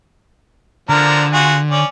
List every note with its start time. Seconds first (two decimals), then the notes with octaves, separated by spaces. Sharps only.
0.89 D3 F3 D4 A#4
1.33 F4 F#4 G#4
1.71 C#4 D5